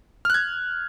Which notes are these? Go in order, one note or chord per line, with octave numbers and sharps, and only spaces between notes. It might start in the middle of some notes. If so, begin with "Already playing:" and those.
F6 F#6 G#6